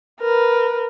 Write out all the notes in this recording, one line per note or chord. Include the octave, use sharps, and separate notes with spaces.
A#4 B4